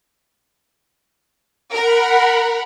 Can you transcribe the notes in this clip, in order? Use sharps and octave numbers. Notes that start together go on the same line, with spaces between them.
A#4 F#5 B5